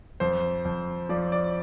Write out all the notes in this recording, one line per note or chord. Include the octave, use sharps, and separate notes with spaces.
F2 C5
F2
F3 D5
D5